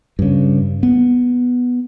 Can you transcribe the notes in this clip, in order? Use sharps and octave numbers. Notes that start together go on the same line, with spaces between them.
G2 C#3
B3